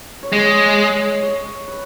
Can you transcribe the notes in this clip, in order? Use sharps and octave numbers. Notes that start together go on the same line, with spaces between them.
C#5
G#3 D#5
C#5
B4